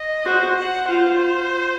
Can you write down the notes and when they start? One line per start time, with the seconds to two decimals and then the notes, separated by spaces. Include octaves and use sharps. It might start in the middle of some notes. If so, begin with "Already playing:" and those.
Already playing: D#5
0.26 F#4 C5
0.57 F#5
0.89 F4 C5